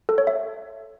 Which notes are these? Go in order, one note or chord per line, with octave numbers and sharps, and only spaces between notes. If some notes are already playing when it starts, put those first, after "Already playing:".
A4
C#5
E5